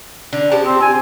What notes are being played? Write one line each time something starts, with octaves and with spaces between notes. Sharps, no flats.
D3
F3 G4 A5
C4
G#5